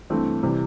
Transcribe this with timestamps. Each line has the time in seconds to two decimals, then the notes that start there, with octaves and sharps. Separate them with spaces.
0.10 G2 E3 A3 C4
0.43 C3 E3 G3